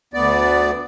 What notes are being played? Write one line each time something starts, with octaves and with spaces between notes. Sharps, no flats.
D2 B3 D5